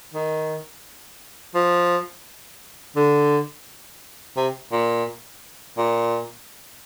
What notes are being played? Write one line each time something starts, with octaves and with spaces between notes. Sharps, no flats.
D#3
F3
D3
C3
A#2
A#2